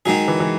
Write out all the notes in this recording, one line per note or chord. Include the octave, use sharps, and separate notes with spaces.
D#3 F#3 G#3 D#4 G#4
E3
E3